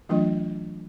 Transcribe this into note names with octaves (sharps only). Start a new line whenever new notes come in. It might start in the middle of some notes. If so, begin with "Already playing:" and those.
E3 F#3 A3 D4 F4 D#5